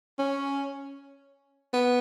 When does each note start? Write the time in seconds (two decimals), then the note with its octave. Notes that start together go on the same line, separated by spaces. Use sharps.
0.19 C#4
1.73 B3